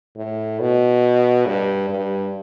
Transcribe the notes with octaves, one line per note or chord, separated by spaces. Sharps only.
A2
B2
G2
G2